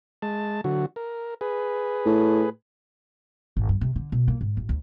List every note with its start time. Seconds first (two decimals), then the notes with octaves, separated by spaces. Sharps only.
0.22 G#3 A5
0.64 D3 F#3 F#4
0.96 A#4
1.41 G#4 B4
2.05 A2
3.57 G#1
3.69 G2
3.81 C3
3.96 D3
4.12 B2
4.28 A#3
4.41 G#2
4.57 A1
4.69 D2